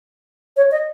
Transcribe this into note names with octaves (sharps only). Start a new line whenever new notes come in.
C#5
D#5